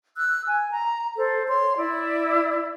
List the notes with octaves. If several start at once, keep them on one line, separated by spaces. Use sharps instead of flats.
E6 F#6
G#5
A#5
A4 C5
C#5 C6
E4 D5